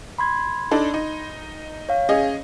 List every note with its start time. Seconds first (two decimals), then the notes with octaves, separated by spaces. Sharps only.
0.18 B5 C6 G#6
0.71 D4 D#4 A4
0.94 D#4
1.89 C#5 F5
2.09 C#4 G#4 D#5